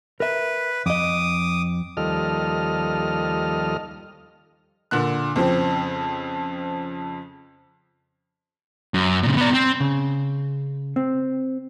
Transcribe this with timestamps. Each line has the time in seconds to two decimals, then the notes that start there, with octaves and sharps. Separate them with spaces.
0.20 A#4 B4 E5
0.86 F2 D#5 D6 D#6
1.97 D#2 F3 G3 A4 D#5 F6
4.91 A#2 D3 F#6
5.36 F2 C#3 F3 C4
8.94 F#2
9.23 A#2 C#3
9.37 B3 D5
9.54 C4
9.80 C#3
10.96 C4